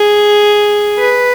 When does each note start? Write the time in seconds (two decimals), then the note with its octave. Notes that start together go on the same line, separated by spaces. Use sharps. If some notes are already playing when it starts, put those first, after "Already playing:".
Already playing: G#4
0.98 B4